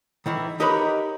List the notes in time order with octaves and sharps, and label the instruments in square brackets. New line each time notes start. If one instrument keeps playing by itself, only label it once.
[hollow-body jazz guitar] D#3 E3 E4
D#4 G4 A#4 B4 C#5 B5